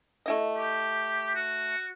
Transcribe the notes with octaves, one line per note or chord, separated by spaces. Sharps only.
A3 E4 D#5
G4
F#4